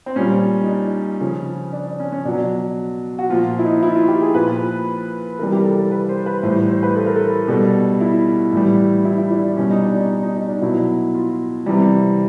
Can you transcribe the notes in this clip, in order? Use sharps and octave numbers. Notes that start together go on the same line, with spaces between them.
C4
A#2 G3 C#4
D#4
D4
C#3 F3 C#4
D4
D4
C#4
C#4
B2 F#3 D4
F#4
A#2 F3 F4
E4
D#4
E4
F4
G4
G#4
A#2 F3 B4
C3 E3 G3 A#4
G4
A#4
A4
A#4
B4
C5
B4
A2 E3 G3 C5
C5
C5
B4
A4
A#4
A4
B2 G3 A4
E4
A2 E3 G3
E4
E4
D4
B2 G3 C#4
D#4
D4
D#4
D#4
D#4
D#4
D4
B2 F#3 E4
F4
C3 E3 G3